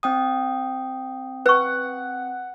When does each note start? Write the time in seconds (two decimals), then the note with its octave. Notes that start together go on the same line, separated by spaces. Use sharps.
0.03 C4 G5 D#6
1.46 B4 F#5 C#6